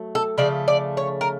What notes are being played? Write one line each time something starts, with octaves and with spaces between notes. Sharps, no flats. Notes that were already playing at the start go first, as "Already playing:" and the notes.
Already playing: F#3 A3
A4
C#3 F3 A3 D5
D5
C#5
A#4